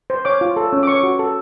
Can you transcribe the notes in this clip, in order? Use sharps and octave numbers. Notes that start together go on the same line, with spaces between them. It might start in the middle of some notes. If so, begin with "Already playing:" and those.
C5
C#5 D6
F4
A4
C#4
D6
C#5 C#6
F#4
A4